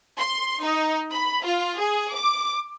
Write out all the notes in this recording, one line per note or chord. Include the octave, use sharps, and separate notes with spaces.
C6
D#4
B5
F4
G#4
D6